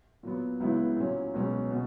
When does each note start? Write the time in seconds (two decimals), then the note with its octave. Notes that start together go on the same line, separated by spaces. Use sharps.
0.23 A#2 F#3 B3
0.60 C#2 C#3 F#3 B3 E4
0.97 A#2 F#3 C#4
1.34 C#2 B2 F#3 C#4
1.71 B2